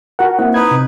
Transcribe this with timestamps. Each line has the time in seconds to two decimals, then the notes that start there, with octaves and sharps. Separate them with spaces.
0.19 F#4 A#4 F#5
0.39 A#3 C4 E4 F#5
0.54 D#4 B4 G#6
0.71 C3